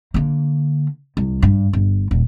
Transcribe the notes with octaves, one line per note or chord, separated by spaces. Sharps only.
D3 A#3
C2
G2
G1
D#1